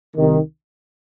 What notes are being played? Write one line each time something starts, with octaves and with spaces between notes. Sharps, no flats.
C2 C3 D#3